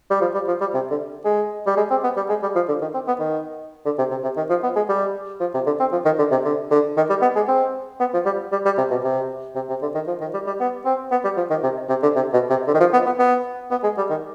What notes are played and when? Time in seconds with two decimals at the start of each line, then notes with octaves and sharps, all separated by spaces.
0.10 G3
0.21 F3
0.34 G3
0.47 F3
0.61 G3
0.74 C3
0.91 D3
1.25 G#3
1.66 G3
1.77 G#3
1.90 C4
2.04 B3
2.16 G3
2.29 G#3
2.42 G3
2.55 F3
2.68 D3
2.81 D#3
2.94 C4
3.08 B3
3.19 D#3
3.85 D3
3.98 C3
4.11 C3
4.23 C3
4.37 D#3
4.49 F3
4.63 B3
4.76 G#3
4.89 G3
5.40 F3
5.54 C3
5.66 D3
5.80 C4
5.92 F3
6.05 D#3
6.18 D3
6.31 C3
6.45 D3
6.71 D3
6.97 D#3
7.10 G3
7.22 B3
7.36 G#3
7.48 C4
8.00 B3
8.13 F3
8.25 G3
8.52 G3
8.65 G3
8.77 C3
8.90 B2
9.04 C3
9.55 C3
9.69 C3
9.82 D3
9.94 D#3
10.07 F3
10.21 D#3
10.34 G3
10.47 G3
10.60 B3
10.85 C4
11.11 B3
11.24 G3
11.37 F3
11.50 D#3
11.63 C3
11.89 C3
12.03 D3
12.16 C3
12.33 B2
12.50 C3
12.67 D3
12.74 D#3
12.80 F3
12.93 B3
13.06 B3
13.19 B3
13.71 B3
13.83 G#3
13.97 G3
14.10 D#3